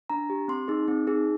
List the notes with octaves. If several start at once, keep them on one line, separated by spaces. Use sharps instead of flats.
D4 A#5
G4
C4 C6
D#4 G#4
C4
D#4 G#4